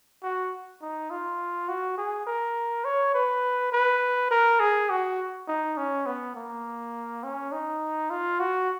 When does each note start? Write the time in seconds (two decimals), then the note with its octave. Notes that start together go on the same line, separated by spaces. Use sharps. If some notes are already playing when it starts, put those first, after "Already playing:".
0.23 F#4
0.81 D#4
1.10 F4
1.69 F#4
1.97 G#4
2.26 A#4
2.85 C#5
3.14 B4
3.72 B4
4.31 A#4
4.60 G#4
4.90 F#4
5.48 D#4
5.77 C#4
6.06 B3
6.35 A#3
7.23 C#4
7.52 D#4
8.10 F4
8.40 F#4